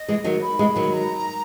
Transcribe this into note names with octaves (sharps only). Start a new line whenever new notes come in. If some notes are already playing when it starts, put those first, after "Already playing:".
Already playing: D#5
E3 G#3
D#3 F#3
B5
E3 G#3
D#3 F#3
A#5